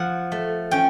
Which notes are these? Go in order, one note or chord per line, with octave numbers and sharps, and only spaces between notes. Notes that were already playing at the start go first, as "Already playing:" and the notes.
Already playing: F3 F#5
A3
C#4 G5